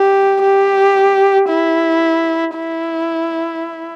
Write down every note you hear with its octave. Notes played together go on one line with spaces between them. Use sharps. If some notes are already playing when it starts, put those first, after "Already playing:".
Already playing: G4
G4
E4
E4